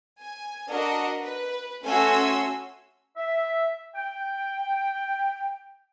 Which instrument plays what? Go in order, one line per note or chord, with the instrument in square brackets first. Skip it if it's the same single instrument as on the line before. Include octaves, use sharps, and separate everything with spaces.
[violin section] G#5
D4 F#4 A#4 D#5
B4
A3 C#4 F#4 G#5 C6 E6
[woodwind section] E5
G5